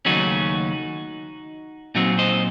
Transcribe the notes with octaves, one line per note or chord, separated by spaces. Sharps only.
D#2 C#3 F#3 A3 C#4 D#4 F#4
A#2 F#3 C4 D#4 F#4
C5 D#5